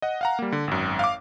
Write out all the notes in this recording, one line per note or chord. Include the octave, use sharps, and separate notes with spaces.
D#5 F#5
F5 F#5 A#5
G3 A#3
D3
G#1 F#2
F5 D6